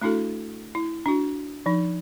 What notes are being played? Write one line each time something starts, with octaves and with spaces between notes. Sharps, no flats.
A3 D4 E4 F#4 A4
E4
D4 F#4
F3 D#4